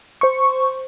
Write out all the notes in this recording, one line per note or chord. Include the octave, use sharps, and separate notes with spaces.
C5 C#6